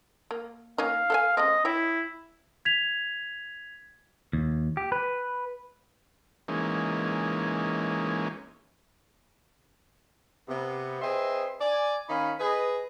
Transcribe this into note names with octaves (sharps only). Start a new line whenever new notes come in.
A#3
A#3 C#4 D#4 F5
A4 F#5 G#5
C#3 A3 C4 D#5
E4 C#5 E5 G5
G#6 B6 F7
D#2
G4
B4
E3 G#3 A#3 C#4 D#4
C3 B3
C4 G#4 B4 D#5 E5 C6
D5 G#5
D#3 C#4 D#4 F5 B5
G#4 B4 D#5